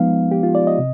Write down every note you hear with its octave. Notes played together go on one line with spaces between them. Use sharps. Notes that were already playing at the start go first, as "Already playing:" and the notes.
Already playing: F3 G#3 B3 D#4 F5
G4
F4
D5
D#5
C3